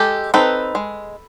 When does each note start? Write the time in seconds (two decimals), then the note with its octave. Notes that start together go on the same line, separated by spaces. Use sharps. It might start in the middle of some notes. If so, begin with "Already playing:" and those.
Already playing: G#3 G4 A4
0.34 C4 D#4 A4 B4
0.75 G#3